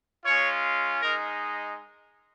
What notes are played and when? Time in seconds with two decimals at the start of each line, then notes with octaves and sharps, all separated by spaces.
0.25 G#3 C#4 F4 C#5
1.02 G#3 D#4 A#4